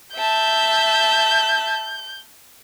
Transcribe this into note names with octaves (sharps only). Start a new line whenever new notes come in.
E5 A5 G6